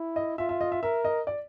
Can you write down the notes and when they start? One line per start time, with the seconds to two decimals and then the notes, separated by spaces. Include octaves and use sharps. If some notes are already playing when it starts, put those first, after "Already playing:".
Already playing: E4
0.16 D#5
0.38 F4 E5
0.49 E5
0.61 D#5
0.72 E5
0.83 A#4 E5
1.05 D#5
1.27 D5